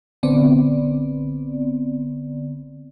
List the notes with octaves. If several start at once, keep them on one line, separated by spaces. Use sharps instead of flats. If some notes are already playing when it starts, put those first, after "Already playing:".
A#1 D3 B3 C4 D5